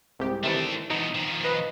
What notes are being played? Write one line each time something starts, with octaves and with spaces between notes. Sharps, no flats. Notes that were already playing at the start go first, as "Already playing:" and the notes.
C2 G#2 G4
C3 D#3 E3 A3 D4
E2 B2 D#4
D#3 F3
B4 D#5